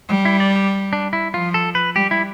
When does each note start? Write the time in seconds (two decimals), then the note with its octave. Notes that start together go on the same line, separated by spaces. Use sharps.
0.09 G3
0.25 E4
0.40 D5
0.56 G4
0.93 D4
1.13 E4
1.34 F3 F4
1.54 A4
1.75 B4
1.96 G3 G4
2.11 E4